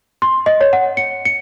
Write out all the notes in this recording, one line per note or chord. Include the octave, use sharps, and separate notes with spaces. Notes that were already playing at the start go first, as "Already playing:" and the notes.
C6
D#5
C#5
F#5
C#7
C#7